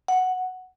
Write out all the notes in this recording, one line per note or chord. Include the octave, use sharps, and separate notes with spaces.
F#5